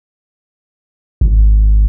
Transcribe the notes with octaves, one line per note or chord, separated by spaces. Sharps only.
G#1